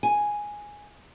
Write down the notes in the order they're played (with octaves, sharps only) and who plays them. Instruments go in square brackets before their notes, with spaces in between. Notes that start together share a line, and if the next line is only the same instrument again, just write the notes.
[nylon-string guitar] G#5